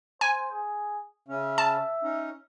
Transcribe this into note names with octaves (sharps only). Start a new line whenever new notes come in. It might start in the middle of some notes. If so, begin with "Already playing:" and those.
C5 G#5
G#4
C#3 C#4 E5
A5
C#4 D#4